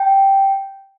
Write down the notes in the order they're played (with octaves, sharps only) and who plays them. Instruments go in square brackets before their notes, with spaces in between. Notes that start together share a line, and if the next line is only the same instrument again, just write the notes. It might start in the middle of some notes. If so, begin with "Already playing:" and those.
Already playing: [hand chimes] G5